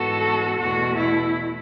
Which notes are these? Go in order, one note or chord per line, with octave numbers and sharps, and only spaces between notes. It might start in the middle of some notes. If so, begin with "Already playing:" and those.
Already playing: G#2 E3 B3 F#4 A4
E2 B2 A3 F#4
E4